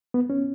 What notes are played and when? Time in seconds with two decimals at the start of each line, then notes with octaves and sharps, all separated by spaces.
0.14 B3
0.30 C#4